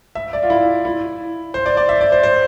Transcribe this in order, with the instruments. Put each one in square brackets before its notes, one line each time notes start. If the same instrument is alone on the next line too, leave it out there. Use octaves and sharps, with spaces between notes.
[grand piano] E5
D5
F4
E4
E4
C5
D5
D5
E5
D5
C5
C5